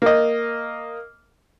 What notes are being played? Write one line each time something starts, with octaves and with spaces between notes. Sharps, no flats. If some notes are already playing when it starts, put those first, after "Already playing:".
A#3 D#5